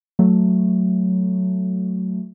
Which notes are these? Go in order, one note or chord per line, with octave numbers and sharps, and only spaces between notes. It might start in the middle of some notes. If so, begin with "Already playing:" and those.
F#3 A3